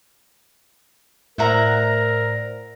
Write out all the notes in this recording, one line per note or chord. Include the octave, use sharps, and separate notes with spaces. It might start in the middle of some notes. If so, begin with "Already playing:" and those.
A2 A#4 C5 D5 E5 F#5 A#5